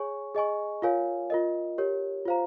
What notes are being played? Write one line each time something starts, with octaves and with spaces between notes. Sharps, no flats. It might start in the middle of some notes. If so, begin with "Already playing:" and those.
Already playing: G#4 C#5 G#5 C#6
G#4 D#5 G#5 C#6
F4 A#4 C#5 F5 G#5
F4 A#4 D#5
G4 A#4 C#5
F4 C5 F5 A#5